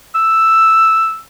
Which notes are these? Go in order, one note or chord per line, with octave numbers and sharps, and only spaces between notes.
E6